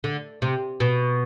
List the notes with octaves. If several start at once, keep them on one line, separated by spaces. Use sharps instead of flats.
D3
C3
B2